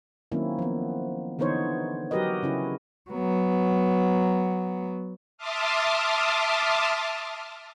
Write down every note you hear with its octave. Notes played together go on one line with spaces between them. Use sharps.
D#3 F#3 A#3 C4 C#4 E4
F3 B3
D3 E3 B3 D#4 C5 C#5
F#3 F#4 G4 A#4 B4 D#5
C#3 C#4 E4
F#3 B3
E5 A5 C6 D6 D#6 F6